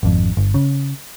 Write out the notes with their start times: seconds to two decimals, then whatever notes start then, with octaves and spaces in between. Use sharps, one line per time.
0.03 G#1 F2
0.37 G1
0.54 C#3